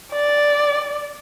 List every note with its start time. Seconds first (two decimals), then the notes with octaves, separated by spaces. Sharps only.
0.13 D5